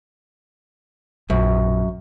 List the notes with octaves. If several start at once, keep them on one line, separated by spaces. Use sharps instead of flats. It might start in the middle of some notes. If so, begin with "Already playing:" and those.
A#1 F#2